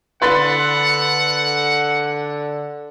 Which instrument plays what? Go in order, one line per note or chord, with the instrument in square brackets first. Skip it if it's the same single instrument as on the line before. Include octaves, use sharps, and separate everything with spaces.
[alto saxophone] D3 [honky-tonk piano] B4 C6 A6 [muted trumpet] F#5